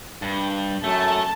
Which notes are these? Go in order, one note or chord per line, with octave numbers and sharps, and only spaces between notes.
G2
F#2 A3 A5